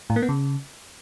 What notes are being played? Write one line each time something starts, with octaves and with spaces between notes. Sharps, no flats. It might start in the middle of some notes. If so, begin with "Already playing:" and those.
A2
A#3
B3
C#3